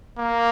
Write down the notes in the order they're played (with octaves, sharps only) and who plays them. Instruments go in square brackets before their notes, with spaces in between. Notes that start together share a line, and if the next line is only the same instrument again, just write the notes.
[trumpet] A#3